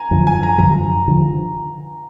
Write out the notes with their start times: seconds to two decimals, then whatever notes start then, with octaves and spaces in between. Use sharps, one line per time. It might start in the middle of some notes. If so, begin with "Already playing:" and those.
Already playing: G#5 A#5
0.11 F#2 D3 F3
0.27 G#5
0.43 A#5
0.58 F#2 D3 F3 A#5
1.08 D3 F3